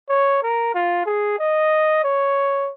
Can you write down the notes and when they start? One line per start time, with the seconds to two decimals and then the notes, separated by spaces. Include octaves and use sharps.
0.10 C#5
0.43 A#4
0.75 F4
1.06 G#4
1.39 D#5
2.04 C#5